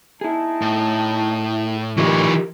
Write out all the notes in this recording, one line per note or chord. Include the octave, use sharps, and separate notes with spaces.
D#4 E4 G#4 A5
A2
E3 D#4 F4 G4 A#4 B4 D5 C#6